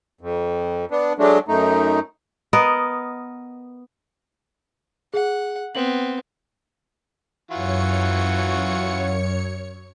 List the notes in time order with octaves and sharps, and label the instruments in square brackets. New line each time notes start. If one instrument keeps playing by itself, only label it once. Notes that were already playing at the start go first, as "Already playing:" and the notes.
[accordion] F2
B3 D4
F#3 G#3 A3 D4
F#2 A3 D#4
[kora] B3 A#4 D#5
[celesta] G#4 [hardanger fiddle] F#5
[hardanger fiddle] B3 C4 [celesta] F#7
[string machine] F#2 C#5 C#7 [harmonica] E3 F4 F#4